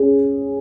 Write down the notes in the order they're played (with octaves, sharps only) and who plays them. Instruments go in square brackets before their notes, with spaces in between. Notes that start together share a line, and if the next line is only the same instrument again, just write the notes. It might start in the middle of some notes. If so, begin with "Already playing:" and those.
Already playing: [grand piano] C#4 G#4